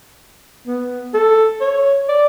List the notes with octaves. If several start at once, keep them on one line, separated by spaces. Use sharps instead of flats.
B3
A4
C#5
D5